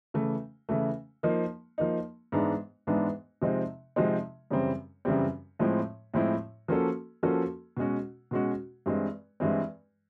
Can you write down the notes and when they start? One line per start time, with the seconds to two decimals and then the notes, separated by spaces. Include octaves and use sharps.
0.14 C#3 E3 A3
0.69 C#3 E3 A3
1.23 F3 A#3 D#4
1.78 F3 A#3 D#4
2.32 G#2 E3 G#3 B3 D4
2.87 G#2 E3 G#3 B3 D4
3.42 C3 F3 G#3 C4 D#4
3.96 C3 F3 G#3 C4 D#4
4.51 F#2 C#3 E3 G3 C4
5.05 F#2 C#3 E3 G3 C4
5.59 A2 F3 G#3 C4 E4
6.14 A2 F3 G#3 C4 E4
6.68 F3 A#3 C#4 F#4 A4
7.23 F3 A#3 C#4 F#4 A4
7.77 B2 G#3 C#4 F#4
8.31 B2 G#3 C#4 F#4
8.86 G2 E3 G#3 C4
9.40 G2 E3 G#3 C4